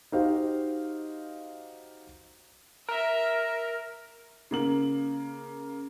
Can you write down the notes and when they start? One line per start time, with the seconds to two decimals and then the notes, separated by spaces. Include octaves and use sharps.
0.12 D#4 F#4 G4 C5 F5
2.89 A#4 E5
4.51 C#3 A#3 F#7